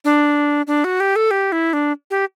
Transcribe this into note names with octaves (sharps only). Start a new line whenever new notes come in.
D4
D4
F#4
G4
A4
G4
E4
D4
G4